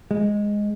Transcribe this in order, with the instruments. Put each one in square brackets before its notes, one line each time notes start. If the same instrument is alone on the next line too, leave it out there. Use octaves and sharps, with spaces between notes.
[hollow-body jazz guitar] G#3